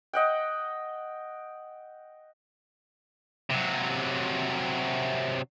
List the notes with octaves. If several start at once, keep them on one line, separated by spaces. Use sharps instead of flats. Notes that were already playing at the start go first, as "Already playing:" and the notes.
D#5 F#5 G5
C3 F#3